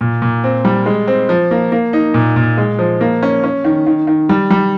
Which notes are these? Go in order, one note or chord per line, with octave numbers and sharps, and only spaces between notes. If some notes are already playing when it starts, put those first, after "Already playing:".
A#2
A#2
C4
G3
G#3
C4
F3
A#3
A#3
D#4
A#2
A#2
G#3
F3
A#3
C#4
C#4
D#3
D#3
D#3
G3
G3